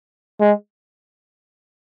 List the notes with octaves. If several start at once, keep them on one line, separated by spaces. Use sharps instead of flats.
G#3